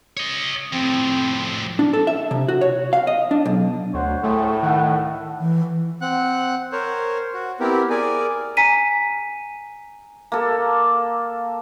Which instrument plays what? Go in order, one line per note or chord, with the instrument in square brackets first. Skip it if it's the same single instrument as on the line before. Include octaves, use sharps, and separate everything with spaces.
[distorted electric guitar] C#5 D#5
[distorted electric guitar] F2 A2 [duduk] C4
[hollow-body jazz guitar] D4
A4
E5
C3
F#4
C#5
F5
D#5
D4
B1
[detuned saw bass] D2 [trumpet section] C5 C#5 F#5
[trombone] A2 [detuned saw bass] A3 [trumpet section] G#4 C#5
[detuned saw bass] D#3 [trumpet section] A3 F#5
[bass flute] E3
[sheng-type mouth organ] C4 F#5 F#6
A#4 C5 C#5
F#4
B3 C4 E4 G4 A#4
G#4 A#4 D5 G#5
[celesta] G#5 A#5 B6 D#7
[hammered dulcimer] A#3 A4